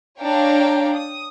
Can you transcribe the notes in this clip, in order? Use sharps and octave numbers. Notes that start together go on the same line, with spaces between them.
D4 C#5 F5 G5 A#5
D#6